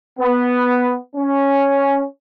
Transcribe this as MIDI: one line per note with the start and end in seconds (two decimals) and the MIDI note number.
0.19 0.97 59
1.16 2.04 61